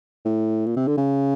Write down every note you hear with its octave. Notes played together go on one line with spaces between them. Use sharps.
A2
A#2
C3
D3
C#3